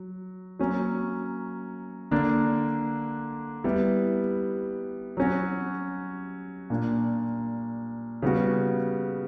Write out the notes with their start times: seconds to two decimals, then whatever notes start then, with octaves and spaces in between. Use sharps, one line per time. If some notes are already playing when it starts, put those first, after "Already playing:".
Already playing: F#3
0.59 F#3 A#3 C#4
2.11 D3 A#3 D4
3.64 G3 B3 E4
5.17 F#3 C#4 F#4
6.70 A#2 A#3 D4
8.22 C#3 G3 B3 F#4